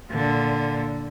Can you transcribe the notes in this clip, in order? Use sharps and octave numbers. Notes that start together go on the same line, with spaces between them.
A#2 D3